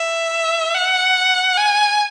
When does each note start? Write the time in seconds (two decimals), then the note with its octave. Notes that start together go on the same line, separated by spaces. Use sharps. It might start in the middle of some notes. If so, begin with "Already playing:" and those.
Already playing: E5
0.75 F#5
1.57 G#5